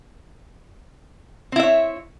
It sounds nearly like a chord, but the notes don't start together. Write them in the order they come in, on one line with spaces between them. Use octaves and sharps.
C4 E4 E5 C#5